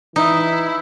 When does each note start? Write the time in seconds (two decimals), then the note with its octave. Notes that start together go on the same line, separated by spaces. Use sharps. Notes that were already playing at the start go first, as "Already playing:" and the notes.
0.16 E3 D#4 E4